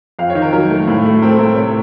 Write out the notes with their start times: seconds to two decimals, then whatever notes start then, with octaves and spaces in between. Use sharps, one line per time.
0.19 F2 F5
0.30 C#5
0.35 D#3
0.42 A#4
0.52 F#3 A#4
0.70 A3
0.88 A2
1.05 A3
1.22 C4 A#4
1.31 A4
1.39 A2 A#4
1.56 C3 C#5